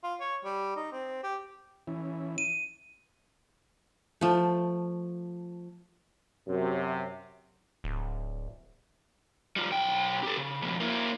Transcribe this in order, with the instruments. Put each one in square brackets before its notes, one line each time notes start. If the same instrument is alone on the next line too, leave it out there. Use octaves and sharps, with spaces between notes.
[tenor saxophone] F4
C#5
G3
D#4
C4
G4
[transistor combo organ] E3 C#4 E4
[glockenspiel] D#7
[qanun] F3 A3
[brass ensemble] F#2 C3
[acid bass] D1
[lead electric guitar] G3 F4
B1 G5
G4 A4
C#3
F2 B2
A#3 E4